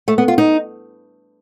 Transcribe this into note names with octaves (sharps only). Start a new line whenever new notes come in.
A3
B3
F4
D#4